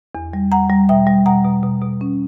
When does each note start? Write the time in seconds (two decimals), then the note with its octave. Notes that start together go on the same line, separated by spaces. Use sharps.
0.15 E2
0.33 G3
0.52 E2 F#5 A#5
0.70 G3
0.89 B2 E5 G5
1.07 G3
1.26 B2 F#5 A#5
1.45 B2
1.63 B2
1.82 B2
2.01 C#4